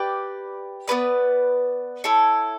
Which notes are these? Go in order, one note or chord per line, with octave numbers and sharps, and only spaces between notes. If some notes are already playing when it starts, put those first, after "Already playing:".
Already playing: G4 B4 D5 G5
B3 E4 B4 D5
E4 A4 C#5